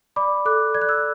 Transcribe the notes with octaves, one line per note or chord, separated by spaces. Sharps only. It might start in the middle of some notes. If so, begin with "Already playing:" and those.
D5 B5 D6
A4 D6 F#6
D5 G#6
F#6
E6 G#6